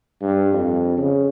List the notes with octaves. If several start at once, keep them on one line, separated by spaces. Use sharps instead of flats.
G2
F2
C#3